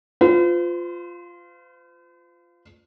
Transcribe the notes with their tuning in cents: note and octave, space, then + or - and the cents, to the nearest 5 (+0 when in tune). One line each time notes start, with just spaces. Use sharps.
F4 +0 C5 -45